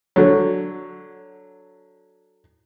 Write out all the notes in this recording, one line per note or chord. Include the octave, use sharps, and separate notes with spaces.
D3 F#3